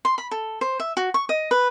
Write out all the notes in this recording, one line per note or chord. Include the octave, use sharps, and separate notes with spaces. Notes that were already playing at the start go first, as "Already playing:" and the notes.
C6
B5
A4
C5
E5
F#4
C#6
D#5
B4